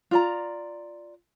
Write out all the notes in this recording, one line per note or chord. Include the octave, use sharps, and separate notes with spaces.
F4 D5 A#5